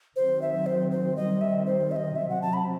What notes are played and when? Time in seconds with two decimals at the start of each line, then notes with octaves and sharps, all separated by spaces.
0.16 D#3 F#3 C4 C5
0.42 E5
0.66 C5
0.91 C5
1.16 D#3 G3 C4 D#5
1.41 E5
1.66 C5
1.91 E5
1.96 D#5
2.16 C3 F#3 C4 E5
2.29 F#5
2.42 A5
2.53 B5